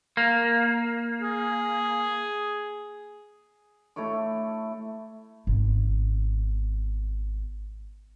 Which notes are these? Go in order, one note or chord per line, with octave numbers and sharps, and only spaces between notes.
A#3
G#4
A3 E4 C#5 D6
G#1 B2